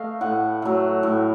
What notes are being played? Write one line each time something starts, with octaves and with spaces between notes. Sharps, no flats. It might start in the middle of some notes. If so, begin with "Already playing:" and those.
Already playing: A3 D#5 F5
A2 F#5
F#3 A3
A2